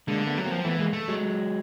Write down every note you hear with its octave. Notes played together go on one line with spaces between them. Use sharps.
D3 G#3 A#3
A3 B3
F#3
A#3 C4
F3
E3 A3 B3
G#3 A#3
A3
F#3 G#3